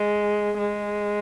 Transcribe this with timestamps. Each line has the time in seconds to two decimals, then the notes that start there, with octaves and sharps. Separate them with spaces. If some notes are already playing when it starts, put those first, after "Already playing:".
Already playing: G#3
0.59 G#3